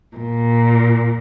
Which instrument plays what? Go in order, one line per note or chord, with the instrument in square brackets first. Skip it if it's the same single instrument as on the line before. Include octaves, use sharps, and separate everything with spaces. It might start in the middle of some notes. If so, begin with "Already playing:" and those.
[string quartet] A#2